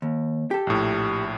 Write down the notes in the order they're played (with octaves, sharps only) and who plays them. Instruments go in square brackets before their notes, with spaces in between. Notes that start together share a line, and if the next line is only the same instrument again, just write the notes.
[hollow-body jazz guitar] D#2
G4 A4
[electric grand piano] A#1 A2